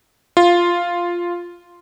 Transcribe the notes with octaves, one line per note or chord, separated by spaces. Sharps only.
F4